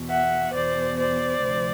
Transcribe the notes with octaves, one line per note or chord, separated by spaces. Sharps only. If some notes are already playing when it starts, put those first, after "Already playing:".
Already playing: E2 B2
E5 F#5
E2 B2 C5 D5
C5 D5
D2 C3 F3